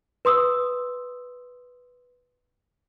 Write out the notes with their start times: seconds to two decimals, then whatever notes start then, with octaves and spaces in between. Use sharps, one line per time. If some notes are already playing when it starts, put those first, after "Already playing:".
0.25 B4 C6 D#6 E6